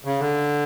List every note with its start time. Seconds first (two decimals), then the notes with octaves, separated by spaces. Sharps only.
0.05 C#3
0.20 D3